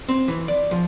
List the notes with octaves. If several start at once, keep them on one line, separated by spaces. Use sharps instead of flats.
C4
E3
D5
F3